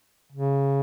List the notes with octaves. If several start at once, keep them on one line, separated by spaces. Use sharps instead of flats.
C#3